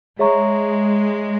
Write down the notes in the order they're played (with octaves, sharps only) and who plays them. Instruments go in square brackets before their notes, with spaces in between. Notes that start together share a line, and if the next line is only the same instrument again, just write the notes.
[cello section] G#3 [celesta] G#4 C#5 E5 A#5 C#6